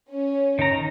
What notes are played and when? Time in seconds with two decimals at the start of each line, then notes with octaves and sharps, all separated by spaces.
0.10 C#4
0.59 D#3 A#5